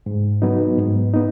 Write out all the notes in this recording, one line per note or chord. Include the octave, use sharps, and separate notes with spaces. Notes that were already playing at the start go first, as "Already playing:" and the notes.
G#2
F#3 B3 D#4
G#2
B3 D#4